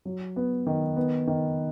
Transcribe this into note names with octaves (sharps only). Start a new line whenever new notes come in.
F#3
B3
D#3
B3
D#3